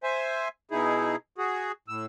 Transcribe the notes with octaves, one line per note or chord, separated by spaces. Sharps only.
C5 E5 G#5
B2 D#4 E4 G#4
F#4 G#4
A2 E6